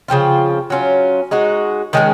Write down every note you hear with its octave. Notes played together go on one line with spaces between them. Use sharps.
C#3 F3 C4 F4
F#3 C#4 F4
G#3 D#4 F#4
D#3 G#3 C#4